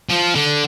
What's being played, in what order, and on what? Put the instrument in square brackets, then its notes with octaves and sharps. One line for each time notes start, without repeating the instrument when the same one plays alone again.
[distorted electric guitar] F3
D3